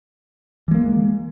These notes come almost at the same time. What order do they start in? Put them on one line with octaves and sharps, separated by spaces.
E3 G#3 A#3